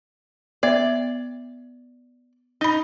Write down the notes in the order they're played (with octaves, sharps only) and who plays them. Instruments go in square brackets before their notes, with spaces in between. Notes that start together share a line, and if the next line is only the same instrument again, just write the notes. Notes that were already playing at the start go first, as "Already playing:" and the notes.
[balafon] B3 E5 [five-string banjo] D5
[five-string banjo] D#4 [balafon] D#5 B5